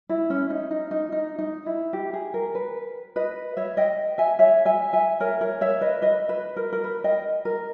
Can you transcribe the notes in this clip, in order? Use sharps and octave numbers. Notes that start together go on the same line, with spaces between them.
E4
C#4
D#4
D#4
D#4
D#4
D#4
E4
G4
G#4
A#4
B4
B4 D#5
C#5 E5
D#5 G5
E5 G#5
C#5 E5
E5 G#5
E5 G#5
A#4 C#5
A#4 C#5
C#5 E5
B4 D#5
B4 D#5
B4
A#4
A#4
B4
D#5 G5
A#4